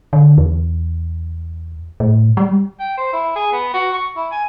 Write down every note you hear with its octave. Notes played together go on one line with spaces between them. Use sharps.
D3
E2
A2
G3
G5
C5
E4
G#4
B3
F#4
C#6
E4
G#5